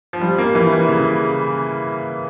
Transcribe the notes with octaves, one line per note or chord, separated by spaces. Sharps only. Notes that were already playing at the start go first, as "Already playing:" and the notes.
F3
G3
A#3
E3
E3
C#3